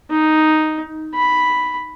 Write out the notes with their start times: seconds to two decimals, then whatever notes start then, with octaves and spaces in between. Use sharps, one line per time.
0.11 D#4
1.15 B5